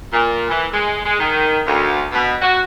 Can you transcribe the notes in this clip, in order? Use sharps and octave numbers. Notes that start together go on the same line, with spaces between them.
A#2
E3
G#3
G#3
D#3
D2
B2
F#4